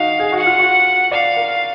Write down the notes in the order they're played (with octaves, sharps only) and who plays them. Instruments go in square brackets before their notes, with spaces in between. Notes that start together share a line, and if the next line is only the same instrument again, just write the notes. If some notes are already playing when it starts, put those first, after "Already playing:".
Already playing: [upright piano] D#4 F#4 [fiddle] F5
[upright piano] G#4
F#4
[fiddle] F#5
[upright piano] F4
F#4
[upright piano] D5 [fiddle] F5
[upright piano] A#4